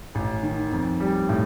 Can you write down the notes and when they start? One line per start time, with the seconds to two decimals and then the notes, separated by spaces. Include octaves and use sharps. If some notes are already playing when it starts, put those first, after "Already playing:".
0.15 A1
0.43 D#3
0.72 F2
1.00 G3
1.29 A2